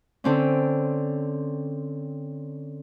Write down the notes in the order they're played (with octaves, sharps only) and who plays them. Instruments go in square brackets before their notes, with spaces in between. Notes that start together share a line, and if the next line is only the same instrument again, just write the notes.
[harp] D3 C4 C#4